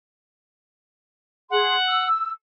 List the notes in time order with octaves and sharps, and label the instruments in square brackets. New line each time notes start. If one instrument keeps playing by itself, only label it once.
[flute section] G#4 C6 [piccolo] F#5
[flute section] E6